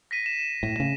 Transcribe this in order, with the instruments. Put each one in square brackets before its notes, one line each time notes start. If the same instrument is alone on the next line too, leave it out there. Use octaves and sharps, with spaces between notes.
[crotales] A#6 B6 D#7
E7
[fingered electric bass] A2
C#3